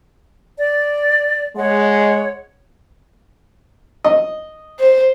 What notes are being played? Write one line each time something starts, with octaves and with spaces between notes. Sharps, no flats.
D5
G#3 C#5 F#5
D#5
C5